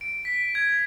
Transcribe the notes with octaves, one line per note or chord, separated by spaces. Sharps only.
D7
B6
G#6